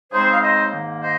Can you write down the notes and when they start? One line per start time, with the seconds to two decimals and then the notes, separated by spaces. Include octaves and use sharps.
0.11 C#3 G#3 C4 D#4 G#4 C5
0.30 F5
0.41 C5 D#5
0.71 G#2 D#3 A#3
1.01 C5 D#5